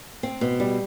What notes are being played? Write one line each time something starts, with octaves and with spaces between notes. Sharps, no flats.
C4
B2
G3